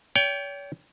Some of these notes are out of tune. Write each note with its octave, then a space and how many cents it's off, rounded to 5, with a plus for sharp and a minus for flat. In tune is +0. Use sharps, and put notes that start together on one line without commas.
C#5 +40 G5 +0